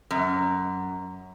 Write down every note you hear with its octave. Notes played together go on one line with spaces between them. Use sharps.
F#2